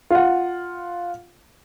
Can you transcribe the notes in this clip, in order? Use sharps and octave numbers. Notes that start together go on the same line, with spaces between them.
F4 F#5